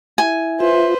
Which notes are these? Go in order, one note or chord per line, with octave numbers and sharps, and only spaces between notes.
E4 E5 G#5
F4 B4 C5 E5